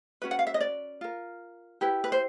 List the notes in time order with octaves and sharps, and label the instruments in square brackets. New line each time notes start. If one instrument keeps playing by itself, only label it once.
[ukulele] C#4 F#4 B4
F#5
F5
E5
D#5
D5
F4 A#4
E4 G4 B4
B4
C5